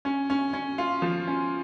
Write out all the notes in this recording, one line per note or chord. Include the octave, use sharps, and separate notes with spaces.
C#4
C#4
C#4
F4
F3
C#4